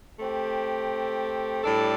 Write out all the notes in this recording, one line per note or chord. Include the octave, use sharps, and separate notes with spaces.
A3 C4 G4
A2 G3 D4 A4 D5